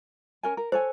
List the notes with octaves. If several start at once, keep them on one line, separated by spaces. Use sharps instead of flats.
C#4 A#4 G#5
A#4
A4 C5 C#5 G#5